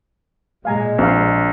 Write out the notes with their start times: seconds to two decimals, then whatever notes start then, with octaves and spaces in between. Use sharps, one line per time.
0.65 A#2 G#3 F5 G#5 A#5
0.98 A#1 C4 F5